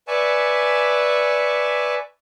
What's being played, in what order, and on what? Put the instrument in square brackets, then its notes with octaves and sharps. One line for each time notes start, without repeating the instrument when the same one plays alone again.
[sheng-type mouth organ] B4 D5 E5 G#5 A5 C#6